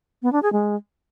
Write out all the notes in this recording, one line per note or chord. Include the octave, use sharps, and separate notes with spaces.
B3
D4
G#4
G#3